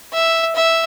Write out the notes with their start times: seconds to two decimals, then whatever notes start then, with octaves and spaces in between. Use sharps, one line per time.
0.13 E5
0.56 E5